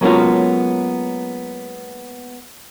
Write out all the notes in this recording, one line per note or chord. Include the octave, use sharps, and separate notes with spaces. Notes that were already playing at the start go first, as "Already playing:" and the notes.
F#3 G#3 A#3 B3 C#4 F4